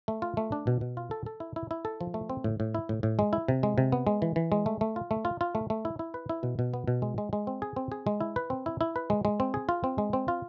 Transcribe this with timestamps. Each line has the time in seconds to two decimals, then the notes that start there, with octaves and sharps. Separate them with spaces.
0.08 A3
0.22 F4
0.37 A3
0.52 D4
0.67 B2
0.81 B2
0.97 F4
1.11 A4
1.26 A4
1.40 E4
1.56 E4
1.71 E4
1.85 A4
2.01 F3
2.14 A3
2.30 C4
2.44 A2
2.60 A2
2.75 E4
2.89 A2
3.03 A2
3.19 G#3
3.33 E4
3.48 C3
3.63 G#3
3.78 C3
3.92 B3
4.07 G#3
4.22 E3
4.36 E3
4.52 G#3
4.66 A3
4.81 A3
4.96 F4
5.11 A3
5.25 F4
5.41 F4
5.55 A3
5.70 A3
5.85 E4
5.99 E4
6.14 B4
6.29 E4
6.43 B2
6.59 B2
6.74 B3
6.88 B2
7.02 G#3
7.18 G#3
7.33 G#3
7.47 C4
7.62 G#4
7.76 C4
7.92 G#4
8.07 G#3
8.21 E4
8.36 B4
8.50 C4
8.66 E4
8.81 E4
8.96 B4
9.10 G#3
9.25 G#3
9.40 C4
9.54 G#4
9.69 F4
9.84 C4
9.98 G#3
10.13 C4
10.28 F4